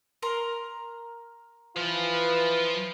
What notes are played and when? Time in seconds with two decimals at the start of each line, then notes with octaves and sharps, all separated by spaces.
0.22 A#4 A#5 C6
1.76 E3 F3 F4 B4